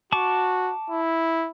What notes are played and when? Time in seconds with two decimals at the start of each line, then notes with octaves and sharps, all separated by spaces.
0.12 F#4 A5 C#6 D6
0.90 E4